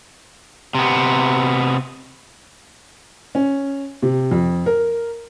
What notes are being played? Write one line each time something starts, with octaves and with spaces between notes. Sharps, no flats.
C3 B3
C#4
C3
F2
A#4